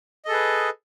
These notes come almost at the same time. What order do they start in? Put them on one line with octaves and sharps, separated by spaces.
D#5 A4 G#4 B4